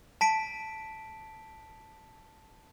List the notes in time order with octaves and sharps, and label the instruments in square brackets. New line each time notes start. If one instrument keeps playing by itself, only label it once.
[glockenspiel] A5 B6 D7